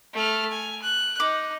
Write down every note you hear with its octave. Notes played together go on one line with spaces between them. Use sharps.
A3 F6
G#5
F#6
D#4 D6